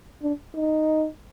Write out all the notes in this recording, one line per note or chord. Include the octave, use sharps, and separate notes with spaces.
D4
D#4